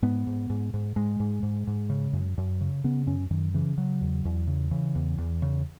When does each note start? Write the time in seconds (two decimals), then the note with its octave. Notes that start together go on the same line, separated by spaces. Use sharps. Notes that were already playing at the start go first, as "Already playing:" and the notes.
0.02 G#2 B3
0.27 G#2
0.50 G#2
0.74 G#2
0.96 G#2 G#3
1.20 G#2
1.43 G#2
1.67 G#2
1.90 C#3
2.13 F#2
2.38 F#2
2.61 C#3
2.84 C#3 B3
3.07 F#2 C#4
3.30 F#2 D#3
3.54 C#3 E3
3.77 C#3 F#3
4.01 E2
4.25 E2
4.47 C#3
4.71 C#3 E3
4.95 E2
5.18 E2
5.42 C#3